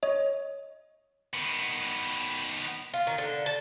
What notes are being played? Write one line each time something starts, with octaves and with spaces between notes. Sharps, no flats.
C#5 D#5
D#3 B3
F4
D#3
D3
A5